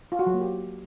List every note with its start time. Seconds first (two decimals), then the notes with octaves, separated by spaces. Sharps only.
0.12 F4
0.19 F#4
0.27 F#3
0.34 A#3
0.41 G4